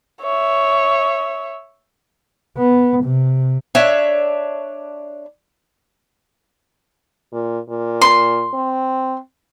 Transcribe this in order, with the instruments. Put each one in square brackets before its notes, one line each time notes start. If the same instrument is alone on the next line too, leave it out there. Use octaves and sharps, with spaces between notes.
[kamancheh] C#5 E5
[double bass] B3
C3
[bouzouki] D4 C#5 E5
[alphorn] A#2
A#2
[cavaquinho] C6
[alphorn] C4